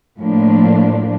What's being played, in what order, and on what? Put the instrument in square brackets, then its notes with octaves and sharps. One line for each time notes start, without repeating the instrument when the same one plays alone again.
[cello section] A2 F3 A#3 D4